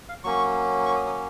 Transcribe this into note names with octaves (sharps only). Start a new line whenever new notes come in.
F5
F#3 A#3 C#4 C#6
C#6
D#6
D#6